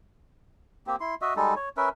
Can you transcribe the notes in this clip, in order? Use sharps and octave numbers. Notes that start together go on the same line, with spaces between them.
A#3 C4 G4
E4 C6
F#4 D#5 E5
G3 G#3 D#4 A4
C#5
C#4 A#4 B4 E5